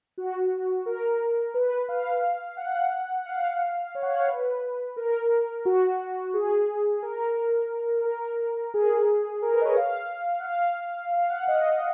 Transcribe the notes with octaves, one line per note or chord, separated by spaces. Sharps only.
F#4
A#4
B4
F5
F#5
F#5
F5
C#5
F#5
F5
C#5
B4
A#4
F#4
G#4
A#4
A#4
G#4
A#4
B4
D#5
C#5
F5
F#5
F5
F5
F#5
D#5